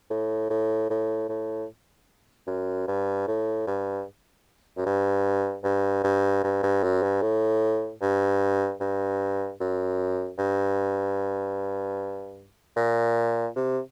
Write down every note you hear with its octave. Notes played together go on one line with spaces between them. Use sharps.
A2
A2
A2
A2
F#2
G2
A2
G2
F#2
G2
G2
G2
G2
G2
F#2
G2
A2
G2
G2
F#2
G2
A#2
C3